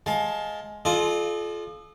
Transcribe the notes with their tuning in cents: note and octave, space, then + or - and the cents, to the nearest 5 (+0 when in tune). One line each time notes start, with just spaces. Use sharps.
G#3 +15 F5 +20 A5 +0
F4 +0 A4 -45 D#5 -45